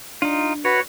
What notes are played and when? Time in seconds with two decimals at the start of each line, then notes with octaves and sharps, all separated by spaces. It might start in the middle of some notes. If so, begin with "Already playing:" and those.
0.22 D4 D#4 F4
0.65 F#4 B4 C#5